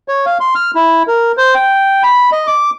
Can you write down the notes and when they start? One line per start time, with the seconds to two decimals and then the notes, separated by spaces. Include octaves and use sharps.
0.08 C#5
0.26 F5
0.40 C6
0.55 F6
0.75 E4
1.08 A#4
1.37 C5
1.55 G5
2.03 B5
2.32 D#5
2.47 D6